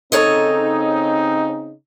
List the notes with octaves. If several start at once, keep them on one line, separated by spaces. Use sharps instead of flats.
C#3 C4 D#4 A4 C#5 D#5